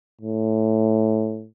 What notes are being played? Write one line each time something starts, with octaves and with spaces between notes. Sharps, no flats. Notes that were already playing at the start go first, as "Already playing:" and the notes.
A2